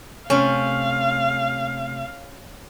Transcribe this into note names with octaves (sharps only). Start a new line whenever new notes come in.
C3 A3 C#4 F5